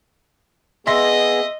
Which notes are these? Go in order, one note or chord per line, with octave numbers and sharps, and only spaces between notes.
B3 G#4 D#5 E5 C6 A#6